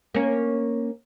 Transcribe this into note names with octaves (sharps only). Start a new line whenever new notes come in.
A#3 C#4